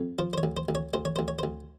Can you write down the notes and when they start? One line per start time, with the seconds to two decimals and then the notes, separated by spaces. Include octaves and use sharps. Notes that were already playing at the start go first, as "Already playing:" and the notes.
Already playing: F2
0.19 F3 C5
0.33 C5
0.38 C#5
0.43 D2
0.57 C5
0.69 D2
0.75 C#5
0.93 D2 C5
1.05 C#5
1.16 D2 C5
1.28 C#5
1.39 D2 C5